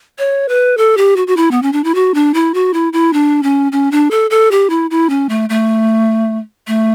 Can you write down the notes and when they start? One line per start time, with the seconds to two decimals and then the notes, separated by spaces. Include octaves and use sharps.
0.18 C#5
0.48 B4
0.77 A4
0.97 G4
1.16 F#4
1.27 F#4
1.37 E4
1.51 B3
1.62 C#4
1.72 D4
1.84 E4
1.95 F#4
2.14 D4
2.34 E4
2.54 F#4
2.74 E4
2.93 E4
3.13 D4
3.43 C#4
3.72 C#4
3.91 D4
4.11 A4
4.30 A4
4.51 G4
4.70 E4
4.91 E4
5.09 C#4
5.29 A3
5.49 A3
6.67 A3